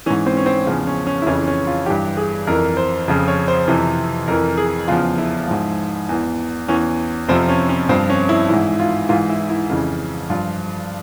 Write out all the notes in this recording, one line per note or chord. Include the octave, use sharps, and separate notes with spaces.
G#2 E3 C#4
C4
C#4
C4
E2 C#3 F3
C#4
C#4
E4
F2 C#3 E3 C#4
C#4
F4
G2 E3 G4
G#4
F2 E3 A#4
C5
F2 C#3 F3
C#5
C5
F2 C3 E3
F2 E3 A#4
G#4
E2 C#3 F3 F4
E4
G#2 F3
E2 E3
E2 E3 C#4
F2 C3 F3 C4
C#4
C#4
G2 F3 C4
C#4
E4
G#2 E3 E4
F4
G#2 E3 F4
E4
E4
F2 C#3 E3
G2 F3 F4